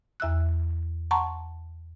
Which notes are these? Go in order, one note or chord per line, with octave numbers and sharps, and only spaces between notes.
E2 E5 E6 F#6
F#5 A5 A#5 C6 C#6